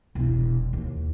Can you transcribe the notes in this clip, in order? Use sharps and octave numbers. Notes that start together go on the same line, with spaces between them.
E1 E4
D#2